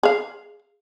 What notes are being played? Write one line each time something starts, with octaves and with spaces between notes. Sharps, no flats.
G#4 F5